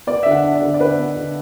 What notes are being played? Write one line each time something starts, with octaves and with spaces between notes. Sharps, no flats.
B3 D5
D3 E5
F#5
D4
D5
D3
D5
D3 B4
B3
D3